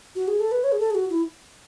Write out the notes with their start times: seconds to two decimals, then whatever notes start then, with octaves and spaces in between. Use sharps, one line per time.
0.15 F#4
0.28 G#4
0.40 A4
0.52 B4
0.64 C#5
0.72 G#4
0.79 A4
0.90 G#4
0.95 F#4
1.10 E4